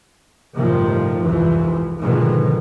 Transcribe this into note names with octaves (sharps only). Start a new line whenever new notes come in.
G1 C2 A2 C3 D#3 F3
C2 F2 G#2 E3 F3
G#2 B2 D3 D#3 F3 G#3